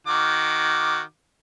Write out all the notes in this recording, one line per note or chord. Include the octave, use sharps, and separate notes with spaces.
D#3 F#4 D6